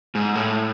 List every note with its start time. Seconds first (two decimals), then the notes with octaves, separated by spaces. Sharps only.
0.15 G#2
0.35 A2